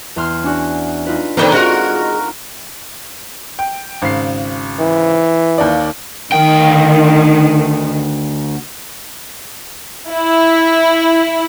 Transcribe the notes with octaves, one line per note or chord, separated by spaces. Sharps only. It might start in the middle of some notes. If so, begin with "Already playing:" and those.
E2 C6 F6
C#4 D4 F#4
D#4 F4 B4
F2 D3 D#3 A#3 C4 A#5
G#3 F4 F#4 A#4
G5
G#1 C#3 C7
E3
D#2 A#3 D5
D2 D#3 G5
E4